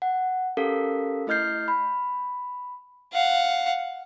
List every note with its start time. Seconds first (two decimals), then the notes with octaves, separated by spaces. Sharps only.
0.02 F#5
0.57 C#4 G4 A4 A#4 F5 B6
1.27 A3 E4 D#5 F6 G6 C7
1.68 B5
3.13 F5 F#5